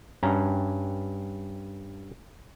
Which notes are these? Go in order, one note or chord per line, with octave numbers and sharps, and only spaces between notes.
G2 C#4 A#5